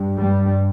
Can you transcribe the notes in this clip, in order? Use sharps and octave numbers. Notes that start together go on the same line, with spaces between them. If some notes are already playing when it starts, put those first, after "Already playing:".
Already playing: G2
G3